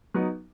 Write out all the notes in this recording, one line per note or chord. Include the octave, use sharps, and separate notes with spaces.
F#3 B3 D#4